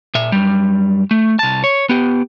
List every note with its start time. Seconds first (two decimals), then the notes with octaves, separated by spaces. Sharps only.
0.15 A#2 E5
0.32 F#2 G3
1.11 A3
1.39 C2 A5
1.64 C#5
1.89 B3 G4